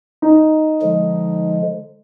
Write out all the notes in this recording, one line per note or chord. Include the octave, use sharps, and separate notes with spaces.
D#4
D3 F3 G#3